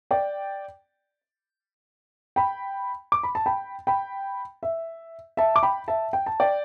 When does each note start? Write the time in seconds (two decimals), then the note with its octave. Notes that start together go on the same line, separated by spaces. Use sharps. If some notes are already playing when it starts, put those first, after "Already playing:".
0.11 D5 G5
2.36 G5 B5
3.12 D6
3.23 B5
3.35 A5
3.46 G5 B5
3.87 G5 B5
4.63 E5
5.37 E5 A5
5.56 D6
5.63 G5 B5
5.88 E5 A5
6.13 G5
6.26 A5
6.40 D5 G5